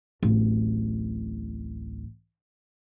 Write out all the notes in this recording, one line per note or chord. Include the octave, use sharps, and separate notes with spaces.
D1 A1